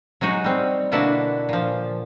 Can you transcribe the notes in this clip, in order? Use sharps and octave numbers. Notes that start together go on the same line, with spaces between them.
F#3 G#3 D#4 F#4
G3 C4
B2 D3 A#3 D4 E4 F#4
A#2 F3